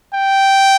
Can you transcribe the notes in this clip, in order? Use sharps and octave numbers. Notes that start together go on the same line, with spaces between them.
G5